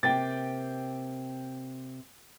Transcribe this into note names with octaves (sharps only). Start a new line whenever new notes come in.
C3 A#3 G5 A6